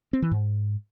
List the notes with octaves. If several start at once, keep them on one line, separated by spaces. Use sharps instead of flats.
C4
E3
G#2